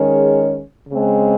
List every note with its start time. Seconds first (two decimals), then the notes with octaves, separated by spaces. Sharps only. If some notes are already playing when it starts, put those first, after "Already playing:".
Already playing: D#3 G#3 C#4 G#4 C#5
0.88 C#3 G#3 C4